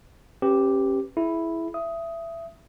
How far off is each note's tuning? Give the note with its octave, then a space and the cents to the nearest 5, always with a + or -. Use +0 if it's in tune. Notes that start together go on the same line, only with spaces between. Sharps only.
C#4 -35 G4 +0 B4 +0
E4 +0 G#4 +30
E5 +20 D#6 +10